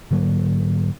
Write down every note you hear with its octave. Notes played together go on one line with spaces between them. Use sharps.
G#2 D3 F#3 A#3